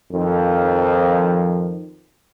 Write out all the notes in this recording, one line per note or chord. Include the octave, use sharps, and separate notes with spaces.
F2 D#3 F3